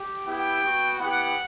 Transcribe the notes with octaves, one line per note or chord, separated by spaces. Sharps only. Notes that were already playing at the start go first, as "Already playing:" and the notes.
Already playing: G4
B3 E4 G4 G5
B3 F#4
B3 E4 G4 F#5